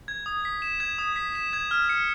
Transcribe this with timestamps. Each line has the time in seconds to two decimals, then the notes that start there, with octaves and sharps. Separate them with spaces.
0.08 G#6
0.26 D#6
0.45 B6
0.62 E7
0.80 G#6
0.98 D#6
1.16 B6
1.35 E7
1.53 G#6
1.71 F6
1.89 C#7